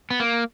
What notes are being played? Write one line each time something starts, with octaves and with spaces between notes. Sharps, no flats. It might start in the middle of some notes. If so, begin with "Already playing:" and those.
B3
A#3